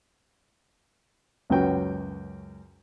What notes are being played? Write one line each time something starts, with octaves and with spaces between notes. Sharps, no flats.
C#2 F#2 C#4 F#4 B4 G5